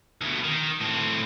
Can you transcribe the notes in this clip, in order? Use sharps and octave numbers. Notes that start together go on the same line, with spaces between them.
D2 B2
D#3
A2 C4